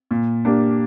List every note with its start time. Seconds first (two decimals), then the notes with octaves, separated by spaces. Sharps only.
0.11 A#2
0.45 A#3 D4 G4